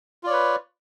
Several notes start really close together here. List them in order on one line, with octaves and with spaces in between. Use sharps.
F4 D5 C#5 B4